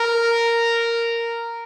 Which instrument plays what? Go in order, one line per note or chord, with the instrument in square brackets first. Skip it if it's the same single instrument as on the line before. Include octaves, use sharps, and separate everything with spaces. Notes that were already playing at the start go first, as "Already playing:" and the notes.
Already playing: [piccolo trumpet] A#4